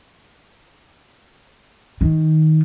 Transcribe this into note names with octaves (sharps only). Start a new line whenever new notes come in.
D#3